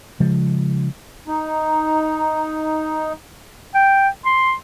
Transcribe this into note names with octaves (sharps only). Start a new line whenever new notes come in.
C#3 F3 G#3
D#4 A#5
G5
C6